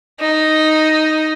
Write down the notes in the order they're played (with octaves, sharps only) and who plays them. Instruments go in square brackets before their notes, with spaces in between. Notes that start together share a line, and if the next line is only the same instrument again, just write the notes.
[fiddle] D#4